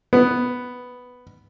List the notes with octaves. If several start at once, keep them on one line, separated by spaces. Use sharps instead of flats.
B3